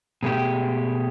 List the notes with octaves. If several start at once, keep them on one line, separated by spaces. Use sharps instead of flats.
B2 G#3 A3 G4